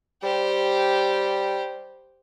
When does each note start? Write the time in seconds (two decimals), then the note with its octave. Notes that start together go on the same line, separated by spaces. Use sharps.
0.23 G3 G4 C5